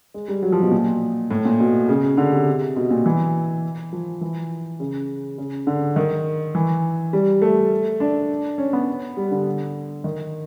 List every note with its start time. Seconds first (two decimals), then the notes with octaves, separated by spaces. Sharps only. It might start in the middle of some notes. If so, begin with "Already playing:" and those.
0.14 G#3
0.28 G3
0.43 F#3
0.52 F3
0.62 B2
0.71 A#2
1.31 A2
1.45 A#2
1.60 B2
1.89 C#3
2.17 D3
2.32 C3
2.76 B2
2.91 A#2
3.06 E3
3.93 F3
4.21 E3
4.80 C#3
5.38 C#3
5.67 D3
5.96 D#3
6.55 E3
7.13 G3
7.42 A3
8.00 D4
8.58 C#4
8.73 B3
9.17 G3
9.31 D3
10.04 D#3